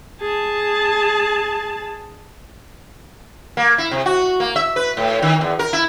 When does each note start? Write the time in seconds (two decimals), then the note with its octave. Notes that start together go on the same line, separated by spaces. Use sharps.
0.21 G#4 A5
3.57 A#3
3.78 E4
3.91 C3
4.06 F#4
4.40 A#3
4.56 E5
4.76 B4
4.97 A2
5.22 D#3
5.41 E2
5.59 A#4
5.73 E4